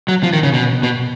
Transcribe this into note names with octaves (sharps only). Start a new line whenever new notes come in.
F#3
F3
D#3
C#3
B2
B2